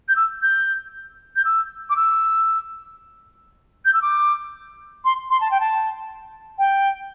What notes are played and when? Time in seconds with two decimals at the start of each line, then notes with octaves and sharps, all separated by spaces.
0.08 G6
0.16 E6
0.42 G6
1.36 G6
1.45 E6
1.90 D6
1.97 E6
3.85 G6
3.94 E6
4.02 D6
5.05 C6
5.30 C6
5.41 A5
5.51 G5
5.60 A5
6.59 G5